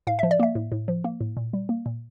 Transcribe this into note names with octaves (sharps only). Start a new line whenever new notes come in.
A2 F5
F3 E5
D5
A#3 E5
A2
A2
F3
A#3
A2
A#2
G3
A#3
A#2